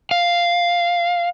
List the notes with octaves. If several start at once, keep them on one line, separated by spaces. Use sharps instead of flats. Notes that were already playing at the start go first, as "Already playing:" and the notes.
F5